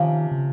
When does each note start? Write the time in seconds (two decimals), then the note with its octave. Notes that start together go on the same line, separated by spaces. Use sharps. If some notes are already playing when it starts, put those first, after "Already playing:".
Already playing: C3 D#3 F3 A#3 C#4
0.31 C#3